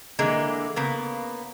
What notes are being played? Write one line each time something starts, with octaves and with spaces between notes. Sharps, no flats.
D3 E3 G#3 A#3
C#3 A#3 B3